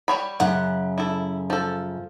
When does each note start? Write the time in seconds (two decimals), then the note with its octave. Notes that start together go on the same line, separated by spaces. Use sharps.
0.08 G3 C#5 B5
0.40 F#2 C#3 F#5
0.98 E4 A4
1.50 F3 A4